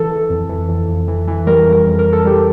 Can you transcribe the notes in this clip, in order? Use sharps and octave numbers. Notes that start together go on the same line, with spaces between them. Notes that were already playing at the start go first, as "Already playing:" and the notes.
Already playing: E3 A4
E3
F2
E3
F2
F2
E3
E3
G3 A#4
F2
A#4
F2
A#4
F2
A4
G3 G4